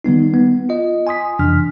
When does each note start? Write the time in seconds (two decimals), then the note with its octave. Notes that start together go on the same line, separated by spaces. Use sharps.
0.04 D#3 G3 B3 D#4
0.34 B3
0.69 F4 D#5
1.07 G#5 C6 D#6 B6
1.39 F2 C3 E3 D4 F6